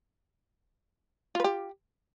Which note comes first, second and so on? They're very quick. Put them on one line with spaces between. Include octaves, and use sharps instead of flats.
F4 B4 G4